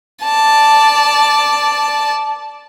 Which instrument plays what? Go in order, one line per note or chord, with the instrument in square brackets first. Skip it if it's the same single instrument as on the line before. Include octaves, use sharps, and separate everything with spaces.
[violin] D5 A5